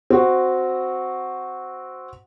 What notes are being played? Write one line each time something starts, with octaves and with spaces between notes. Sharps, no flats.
C4 F#4